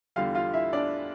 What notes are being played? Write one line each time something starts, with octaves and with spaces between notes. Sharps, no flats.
E2 D3 G3 F4 F5
F4 F5
E4 E5
D4 D5